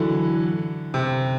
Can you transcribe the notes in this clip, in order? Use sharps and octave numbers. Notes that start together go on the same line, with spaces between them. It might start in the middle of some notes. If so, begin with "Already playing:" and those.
Already playing: D3 E3 F#3
C3